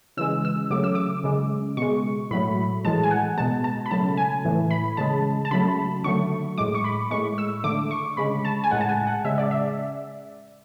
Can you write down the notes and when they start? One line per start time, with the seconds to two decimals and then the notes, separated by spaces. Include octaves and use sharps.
0.17 C#3 E3 G#3 E6
0.45 E6
0.70 C#3 F#3 A3 D6
0.84 E6
0.95 D6
1.24 C#3 G#3
1.77 B2 G#3 C#6
2.31 A2 F#3 A3 B5
2.85 A2 E3 G#3 A5
3.03 G#5
3.11 F#5
3.37 B2 G#3 A5
3.64 A5
3.86 B5
3.91 C#3 F#3 A3 A5
4.17 G#5
4.45 A2 E3 A3
4.71 B5
4.97 C#3 G#3 A5
5.45 A5
5.51 C#3 F#3 A3 B5
6.04 D3 F#3 A3 C#6
6.58 A2 G#3 D6
6.75 C#6
6.84 B5
7.11 A2 G#3 C#6
7.38 E6
7.64 D3 A3 D6
7.91 C#6
8.17 C#3 G#3 B5
8.45 A5
8.64 G#5
8.71 A2 G#3 F#5
8.81 A5
8.89 G#5
9.07 F#5
9.25 C#3 G#3 E5
9.38 D5
9.51 E5